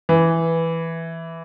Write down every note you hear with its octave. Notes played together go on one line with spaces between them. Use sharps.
E3